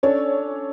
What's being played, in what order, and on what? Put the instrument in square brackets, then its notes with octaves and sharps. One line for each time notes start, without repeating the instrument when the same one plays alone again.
[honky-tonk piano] C#4 C#5 [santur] D4 A4 D5